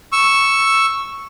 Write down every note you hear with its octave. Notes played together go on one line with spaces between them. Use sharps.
C#6 E6